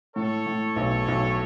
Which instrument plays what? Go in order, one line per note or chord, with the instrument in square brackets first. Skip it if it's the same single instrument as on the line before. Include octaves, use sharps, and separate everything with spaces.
[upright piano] A2 [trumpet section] A4 C#5
[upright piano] A2
B1
B1